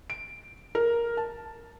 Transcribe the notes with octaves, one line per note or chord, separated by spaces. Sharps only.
D7
A#4
A5